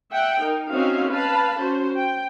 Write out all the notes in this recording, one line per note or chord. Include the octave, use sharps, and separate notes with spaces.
E5 F#5 G5
D#4 A#4
C4 C#4 D#4 F#4 E5 F5
B4 F5 A5 B5
C#4 F#4 C5
G5